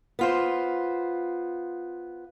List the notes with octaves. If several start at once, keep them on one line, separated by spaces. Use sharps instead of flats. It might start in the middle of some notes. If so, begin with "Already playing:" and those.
B3 F4 C5